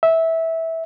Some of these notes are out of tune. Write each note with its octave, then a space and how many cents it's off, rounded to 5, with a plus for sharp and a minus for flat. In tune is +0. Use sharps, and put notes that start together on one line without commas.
E5 -15